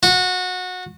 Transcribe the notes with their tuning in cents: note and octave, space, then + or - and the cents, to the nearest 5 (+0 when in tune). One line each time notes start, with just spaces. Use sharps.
F#4 -20